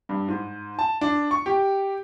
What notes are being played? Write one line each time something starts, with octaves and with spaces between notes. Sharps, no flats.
G2
G#2
A5
D4
C#6
G4